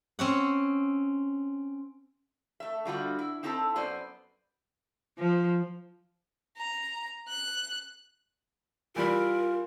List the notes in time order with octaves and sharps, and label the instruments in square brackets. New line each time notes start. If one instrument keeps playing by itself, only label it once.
[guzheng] C4 C#4 F#5
[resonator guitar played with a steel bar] A3 E5
D3 G3 F4 F#4
E4
C4 D#4 E4 A4 A5
F#2 B3 C5 D5
[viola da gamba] F3
[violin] A#5
F#6
[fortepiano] E3 G3 B5 [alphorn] F4 [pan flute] A#4